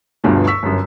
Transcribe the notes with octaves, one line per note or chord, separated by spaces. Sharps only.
G1 D2 G2 B2 D3 F3
C#6 E6 B6
G1 F#2